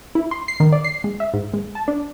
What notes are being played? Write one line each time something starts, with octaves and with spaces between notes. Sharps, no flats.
E4
C6
C7
D#3
D5
C7
G#3
E5
G#2
G#3
A5
D4